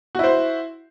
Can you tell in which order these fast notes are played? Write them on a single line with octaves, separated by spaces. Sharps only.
F#4 E4 C5